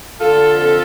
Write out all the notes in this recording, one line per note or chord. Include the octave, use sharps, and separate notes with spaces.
D3 F4 A4
F2